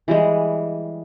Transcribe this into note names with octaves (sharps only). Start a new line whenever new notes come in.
E3 G3 G#3